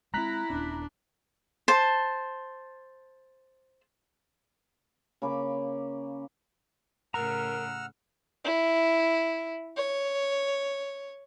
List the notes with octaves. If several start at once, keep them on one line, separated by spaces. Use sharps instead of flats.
G#3 A#3 C4 E4 A#5 F#6 B6
D#1 B3 C#4 D4
C5 A5
C#3 A#3 B5 D6
A2 C#3 A#4 F#5 A#5 E6 F6
E4
C#5